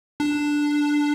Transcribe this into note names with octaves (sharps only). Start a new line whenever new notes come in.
D4